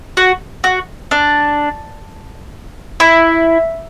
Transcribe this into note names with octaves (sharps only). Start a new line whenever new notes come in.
F#4
F#4
D4
E4